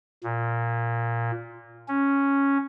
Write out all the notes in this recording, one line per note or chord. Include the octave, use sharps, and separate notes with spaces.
A#2
C#4